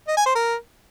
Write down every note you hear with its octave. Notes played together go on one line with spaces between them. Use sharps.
D#5
G#5
C5
A#4